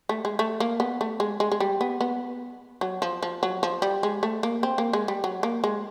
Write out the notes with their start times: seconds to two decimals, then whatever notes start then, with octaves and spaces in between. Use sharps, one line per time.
0.09 A3
0.25 G#3
0.39 A3
0.60 A#3
0.80 B3
1.01 A3
1.20 G#3
1.40 G#3
1.52 G#3
1.60 G3
1.81 B3
2.01 B3
2.81 F#3
3.02 F3
3.23 F3
3.43 F#3
3.63 F3
3.82 G3
4.03 G#3
4.23 A3
4.43 A#3
4.63 C4
4.78 A#3
4.93 G#3
5.08 G3
5.24 F#3
5.43 A#3
5.64 G#3